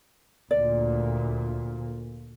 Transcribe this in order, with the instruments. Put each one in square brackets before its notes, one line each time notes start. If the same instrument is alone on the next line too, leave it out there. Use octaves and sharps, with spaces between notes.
[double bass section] D2 A#2 [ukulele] D5